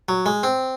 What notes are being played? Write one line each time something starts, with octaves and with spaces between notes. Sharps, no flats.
F#3
G#3
C4